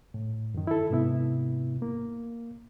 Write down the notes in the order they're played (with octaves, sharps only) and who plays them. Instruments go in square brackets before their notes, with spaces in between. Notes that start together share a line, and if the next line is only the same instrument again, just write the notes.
[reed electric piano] A2
F#2 D#3
E4 A4
G#2 C3 B3 E4
A#3